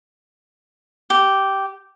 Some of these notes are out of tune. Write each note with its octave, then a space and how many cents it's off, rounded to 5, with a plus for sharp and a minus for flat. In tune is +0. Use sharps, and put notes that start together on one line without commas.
G4 -10